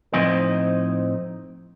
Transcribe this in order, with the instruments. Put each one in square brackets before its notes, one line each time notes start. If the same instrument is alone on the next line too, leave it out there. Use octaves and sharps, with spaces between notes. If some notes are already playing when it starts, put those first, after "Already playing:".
[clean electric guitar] A2 F3 C4 D#4 D#5